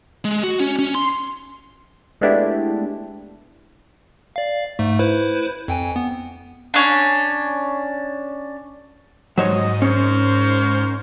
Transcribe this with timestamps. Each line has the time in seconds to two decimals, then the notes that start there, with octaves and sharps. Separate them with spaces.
0.25 G#3
0.43 F#4
0.60 C#4
0.79 C#4
0.95 C6
2.21 G#3 A3 B3 D4 E4 G4
4.36 D5 F5
4.79 G#2 A3
4.99 E4 B4 C5
5.68 F2 G5 G#5
5.96 B3
6.74 C#4 D4
9.38 G#2 F#3 C5 C#5 D#5
9.82 C#4 A#4 C5 C#5